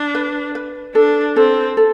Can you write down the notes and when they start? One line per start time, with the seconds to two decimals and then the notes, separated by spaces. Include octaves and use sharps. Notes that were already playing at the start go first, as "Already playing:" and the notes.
Already playing: D4
0.15 B4
0.55 B4
0.95 D4 A4
1.36 C4 A4
1.77 A4